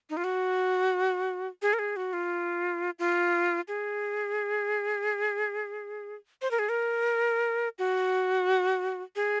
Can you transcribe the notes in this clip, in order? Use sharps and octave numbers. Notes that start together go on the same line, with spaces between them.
D#4
F4
F#4
G#4
A#4
G#4
F#4
F4
F4
G#4
C5
A#4
G#4
A#4
F#4
G#4